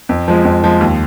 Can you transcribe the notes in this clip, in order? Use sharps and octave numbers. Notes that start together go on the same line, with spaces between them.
F2
F3 G#3
F2
F3 G#3
D#2